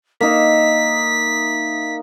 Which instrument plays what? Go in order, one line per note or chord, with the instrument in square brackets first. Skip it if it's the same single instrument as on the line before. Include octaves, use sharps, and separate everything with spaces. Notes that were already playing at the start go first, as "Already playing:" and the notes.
[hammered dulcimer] A#3 D#4 E5 [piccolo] B6